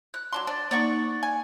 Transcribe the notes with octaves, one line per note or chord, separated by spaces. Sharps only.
F#6
F#3 D4 C6
D4 D5
A#3 D#4 D5 F#5 C#6
G#5